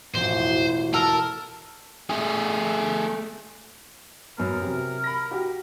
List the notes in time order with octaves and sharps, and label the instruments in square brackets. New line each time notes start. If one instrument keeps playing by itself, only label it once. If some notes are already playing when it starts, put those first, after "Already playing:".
[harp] E1 A1 F2 [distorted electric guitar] C5
[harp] F#4
[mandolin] A4 [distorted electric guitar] A#4
[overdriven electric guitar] A3 G#4
[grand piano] F#2 B3 [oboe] A#4
[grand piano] C3 F#3
B5 A#6
F#4 G4